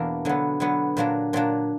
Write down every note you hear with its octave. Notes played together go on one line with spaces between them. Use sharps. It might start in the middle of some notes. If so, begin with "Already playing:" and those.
Already playing: E2 B2 A#3 D4 A#4
D3 F#3 B3
D3 F#3 B3
A#2 F#3 A#3 D4
A#2 F#3 A#3 D4